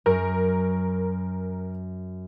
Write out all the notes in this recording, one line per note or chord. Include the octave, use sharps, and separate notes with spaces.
F#2 A#4